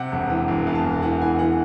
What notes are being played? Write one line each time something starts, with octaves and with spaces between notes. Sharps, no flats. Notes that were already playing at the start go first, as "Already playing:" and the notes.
Already playing: C3 F#5
E1
E3
E1
E2
A5
E1
E3 F#5
E2 G#5
E3 F#5